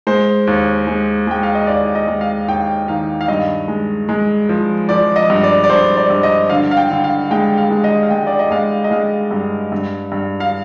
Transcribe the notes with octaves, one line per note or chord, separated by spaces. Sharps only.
G#3 C5
D#2
G#3
G#3 G5
F5
D#5
D#2 D5
D#5
G#3
F5
D#2 G5
D#3 F5
F5
G2 D#5
G#3
G#3
F3
F3 D5
D#5
G2
D5
D5
G2 C5
D5
G2
D#5
D3 F5
F5
G5
D3
F5
G#3 G5
F5
G#3
D#5
F5
G#3 G5
D5
D#5
G#3 F5
D#5
G#3 F5
G2
G2
G2
F5